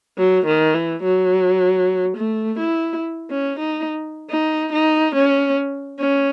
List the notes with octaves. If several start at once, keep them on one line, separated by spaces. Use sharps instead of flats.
F#3
D#3
E3
F#3
A3
E4
C#4
D#4
D#4
D#4
C#4
C#4